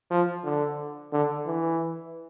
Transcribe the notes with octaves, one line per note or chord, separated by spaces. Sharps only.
F3
D3
D3
E3